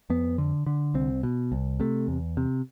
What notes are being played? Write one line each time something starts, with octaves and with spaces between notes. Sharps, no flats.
F2 B3
D3
D3
C2 C4
B2
C2
C3 A3
E2
C3